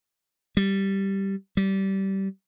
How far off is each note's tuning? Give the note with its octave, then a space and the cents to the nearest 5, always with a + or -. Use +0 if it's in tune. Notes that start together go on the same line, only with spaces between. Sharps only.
G3 -5
G3 -20